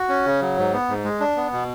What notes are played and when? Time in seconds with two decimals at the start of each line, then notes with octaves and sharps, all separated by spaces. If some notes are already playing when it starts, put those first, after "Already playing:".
Already playing: F#4
0.09 C#4
0.25 C#3
0.41 F#3
0.57 G#2
0.73 B3
0.89 G#2
1.04 G#3
1.20 D4
1.37 B3
1.53 B2